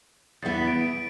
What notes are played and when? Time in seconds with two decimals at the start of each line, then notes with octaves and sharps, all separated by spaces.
0.42 E2 E3 B3 E4 A6
0.56 B6
0.67 D7
0.81 D7
0.93 D7